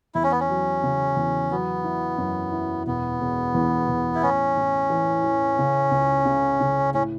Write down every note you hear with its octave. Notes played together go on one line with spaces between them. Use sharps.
E2 E4
C#4
B3
C#4
F#3
C#3
E2
F#3 B3
E4
F#2
E4
E1 B3
E1
E2
E2
E4
A2 C#4
A1
E3
E3
C#3
C#2
C#3
C#3
A2 C#4